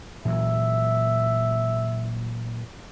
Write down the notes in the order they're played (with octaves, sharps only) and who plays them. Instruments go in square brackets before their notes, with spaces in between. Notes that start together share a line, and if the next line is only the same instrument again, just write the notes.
[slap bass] A#2 E3 F#3 [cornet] E5